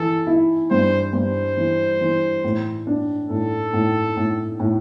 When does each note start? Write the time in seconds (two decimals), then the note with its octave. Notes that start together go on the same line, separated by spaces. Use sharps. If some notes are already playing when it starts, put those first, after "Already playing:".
Already playing: E3 A4
0.27 E4
0.71 G2 C5
1.13 G2 C5
1.57 E3
2.01 E3
2.44 A2
2.87 D4
3.30 A2 A4
3.73 A2
4.17 A2
4.60 A2